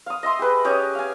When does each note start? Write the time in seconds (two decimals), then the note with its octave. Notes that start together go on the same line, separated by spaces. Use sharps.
0.06 F5 D#6
0.23 D#5 E5 C6 D#6
0.39 G4 G#4 B4
0.65 C#4 G4 G#4 D#5
0.95 F5 G#5